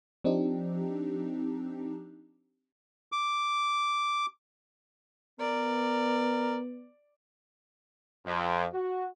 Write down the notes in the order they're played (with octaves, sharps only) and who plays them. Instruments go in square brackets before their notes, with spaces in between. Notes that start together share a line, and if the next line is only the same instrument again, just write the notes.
[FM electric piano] F3 C4 D4 D#4 G4
[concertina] D6
[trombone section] B3 [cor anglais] A#4 [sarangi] D5
[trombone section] F2
F#4